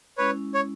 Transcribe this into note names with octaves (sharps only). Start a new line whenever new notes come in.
G#3 C#4 E4 B4 C#5
C#5